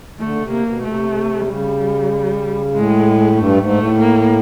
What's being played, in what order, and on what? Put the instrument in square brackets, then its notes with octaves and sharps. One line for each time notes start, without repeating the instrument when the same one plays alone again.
[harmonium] D3 [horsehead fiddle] A3
[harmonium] C#3
C3
[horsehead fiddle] A#3
[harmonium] B2
[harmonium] C3 [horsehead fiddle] A3
[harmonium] C#3 [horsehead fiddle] G3
[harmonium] A2 [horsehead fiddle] G#3
[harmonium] G2 [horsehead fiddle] A3
[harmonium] G#2
[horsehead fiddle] A3
[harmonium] A2
[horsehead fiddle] A#3